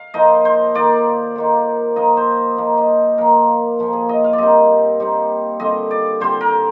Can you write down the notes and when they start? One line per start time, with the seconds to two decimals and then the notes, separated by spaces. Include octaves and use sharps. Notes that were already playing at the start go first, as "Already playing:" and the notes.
Already playing: F5
0.14 F3 A#3 D#4 D#5
0.45 C5
0.74 D#3 A#3 F4 D5
1.36 D#3 A#3 F4
1.96 F3 A#3 D#4 D#5
2.17 C5
2.57 F3 A#3 D#4
2.77 D#5
3.18 A#2 F3 A#3 A#4
3.79 A#2 F3 A#3
3.93 G#4
4.09 D#5
4.24 F5
4.33 D5
4.38 A#2 G3 C4 D#4 D#5
5.00 A#2 G3 C4 D#4
5.60 D3 G3 C4 F4 D#5
5.91 D5
6.20 D3 G3 C4 F4 C5
6.41 A#4